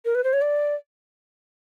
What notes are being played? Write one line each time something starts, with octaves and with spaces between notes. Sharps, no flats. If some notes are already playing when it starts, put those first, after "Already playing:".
A#4
B4
C5
C#5
D5